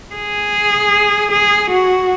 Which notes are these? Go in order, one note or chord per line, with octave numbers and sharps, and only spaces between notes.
G#4
G#4
F#4